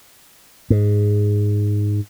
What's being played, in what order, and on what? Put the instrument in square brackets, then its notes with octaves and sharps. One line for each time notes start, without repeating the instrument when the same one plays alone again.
[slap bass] G#2